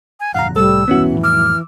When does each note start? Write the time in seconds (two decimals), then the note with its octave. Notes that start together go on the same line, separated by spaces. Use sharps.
0.20 G#5
0.34 G1 F2 A#2 F5 F#5 A#5
0.56 C2 A2 G3 A4 E6
0.88 E1 B1 G2 E3 B3 C#4 F#4
1.12 F2 A2
1.24 D6 E6 F6